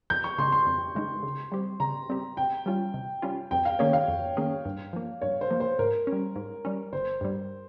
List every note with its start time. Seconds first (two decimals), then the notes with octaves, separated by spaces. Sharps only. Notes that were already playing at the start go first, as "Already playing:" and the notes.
0.10 F2 G6
0.24 C#6
0.38 C#3 G#3 D#4 C6
0.52 C6
0.66 F2
0.95 C#3 G#3 D#4
1.23 C#3
1.52 G3 C4 G4
1.80 C#3 A#5
2.09 G3 C4 G4
2.37 C3 G5
2.66 G3 C#4 F4
2.94 C3
3.22 G3 C#4 F4
3.51 F2 G5
3.65 F5
3.79 D#3 A#3 C#4 G#4 C#5
3.93 F5
4.08 F2
4.37 D#3 A#3 C#4 G#4
4.65 G2
4.93 F3 A#3
5.21 G2 C#5
5.41 C5
5.51 F3 A#3
5.60 C5
5.79 G#2 A#4
6.07 C#4
6.12 G3
6.36 G#2
6.65 G3 C#4
6.92 G1 C5
7.21 G2 G3